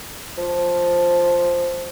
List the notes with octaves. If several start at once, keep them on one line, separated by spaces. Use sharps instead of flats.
F3